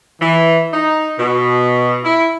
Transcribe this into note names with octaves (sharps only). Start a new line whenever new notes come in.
E3
D#4
B2
E4